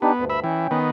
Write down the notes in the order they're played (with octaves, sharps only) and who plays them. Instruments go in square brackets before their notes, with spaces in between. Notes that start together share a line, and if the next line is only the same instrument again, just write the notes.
[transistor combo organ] B3 [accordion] D4 D#4 G4
[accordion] D2 G2
[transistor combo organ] E5 B5
[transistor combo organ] E3 [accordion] C#4 G5
[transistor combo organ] D#3 B3